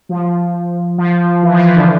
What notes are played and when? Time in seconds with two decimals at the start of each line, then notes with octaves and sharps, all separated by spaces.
0.09 F3
0.98 F3
1.43 E3
1.53 F3
1.65 E3
1.76 D3